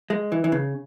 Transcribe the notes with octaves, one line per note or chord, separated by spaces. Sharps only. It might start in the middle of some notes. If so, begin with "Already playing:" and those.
G#3
E3
E3
C#3